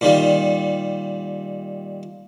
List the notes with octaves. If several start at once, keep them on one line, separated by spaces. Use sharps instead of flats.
A#2 D#3 G3